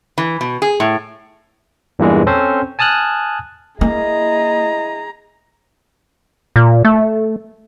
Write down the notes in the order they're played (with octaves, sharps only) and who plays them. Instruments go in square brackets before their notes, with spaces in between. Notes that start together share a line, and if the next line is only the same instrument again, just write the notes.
[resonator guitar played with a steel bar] E3
B2
G#4
A2
[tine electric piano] E2 G2 A#2 E3 G#3
C4 C#4 A4 C5
G#5 A5 D#6 F6 F#6
[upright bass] A#3 [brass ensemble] E4 D#5 [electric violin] G#4 A#5
[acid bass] A#2
A3